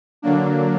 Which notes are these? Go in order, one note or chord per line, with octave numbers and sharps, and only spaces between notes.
D3 F#3 A#3 D4